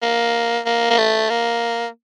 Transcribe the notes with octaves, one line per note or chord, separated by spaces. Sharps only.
A#3
A#3
A#3
A3
A#3